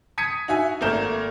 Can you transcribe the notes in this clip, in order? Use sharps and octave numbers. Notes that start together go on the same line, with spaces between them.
D#6 G#6 B6 C#7 D#7
D#4 F#4 E5 G#5
G#1 A3 A#3 A#4 G6 E7